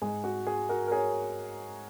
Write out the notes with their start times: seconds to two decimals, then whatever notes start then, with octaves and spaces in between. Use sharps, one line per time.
0.02 G#2 G#3 G#4
0.24 F#4
0.47 G#4
0.69 F#4 A#4
0.87 A#4
0.91 G#4 C#5